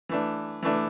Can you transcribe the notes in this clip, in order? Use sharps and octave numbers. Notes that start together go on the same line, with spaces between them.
E3 A3 D4
E3 A3 D4